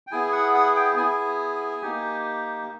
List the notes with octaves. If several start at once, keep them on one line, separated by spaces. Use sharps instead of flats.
G5
B3 E4 G#4 G#5
F#5
F#5
G5
B3 E4 G#4 G#5
A#3 D#4 G4